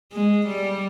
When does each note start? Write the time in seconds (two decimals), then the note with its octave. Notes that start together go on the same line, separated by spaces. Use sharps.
0.13 G#3
0.46 G3